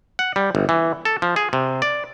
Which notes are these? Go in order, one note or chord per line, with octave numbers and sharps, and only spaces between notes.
F#5
G3
G1
E3
A4
F3
G#4
C3
D5